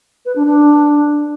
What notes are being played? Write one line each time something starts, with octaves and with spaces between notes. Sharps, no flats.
B4
D4
D4